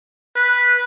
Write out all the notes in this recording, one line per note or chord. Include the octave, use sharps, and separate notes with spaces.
B4